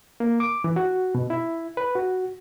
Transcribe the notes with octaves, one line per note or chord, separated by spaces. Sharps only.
A#3
D6
E3
F#4
B2
E4
B4
F#4